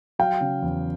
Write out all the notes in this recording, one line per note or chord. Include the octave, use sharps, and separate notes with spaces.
F#3 F5 G5
C#3
E2